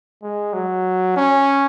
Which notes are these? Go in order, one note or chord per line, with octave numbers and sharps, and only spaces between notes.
G#3
F#3
C#4